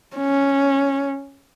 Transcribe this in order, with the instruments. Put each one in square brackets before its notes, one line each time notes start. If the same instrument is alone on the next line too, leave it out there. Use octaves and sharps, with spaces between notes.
[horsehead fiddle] C#4